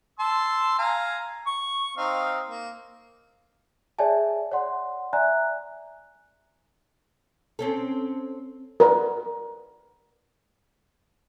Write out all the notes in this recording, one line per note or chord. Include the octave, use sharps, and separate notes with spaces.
A5 C6 E6
F5 G#5 A#5
C#6
C4 D#4 F5
A#3
G#4 C#5 D5 E5 G#5 A5
C#5 D5 F#5 C6
D5 E5 G#5 A#5 F#6
C4 C#4 A4
A#4 B4 D5